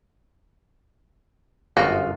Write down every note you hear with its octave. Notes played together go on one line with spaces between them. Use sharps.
G1 F#2 F4 F#4